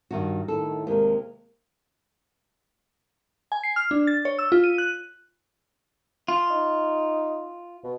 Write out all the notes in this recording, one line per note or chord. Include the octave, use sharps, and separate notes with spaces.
G2 D#3 F#4
A2 D#3 A4
D#2 C3 G#3 A#3 A#4
G#5
C7
F6
D4
A6
C#5
E6
F4
D#7
F#6
F4
D#4
B2